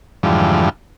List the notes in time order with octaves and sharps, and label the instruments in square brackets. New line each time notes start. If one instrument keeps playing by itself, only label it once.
[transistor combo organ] F2 G#2 D3 E3 F3 G3